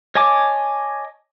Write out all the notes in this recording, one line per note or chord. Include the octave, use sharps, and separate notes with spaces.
C#5 D#5 G#5 A5 D6